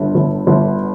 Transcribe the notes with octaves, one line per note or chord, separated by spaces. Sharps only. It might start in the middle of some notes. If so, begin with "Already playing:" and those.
Already playing: G1 G2
G1
G1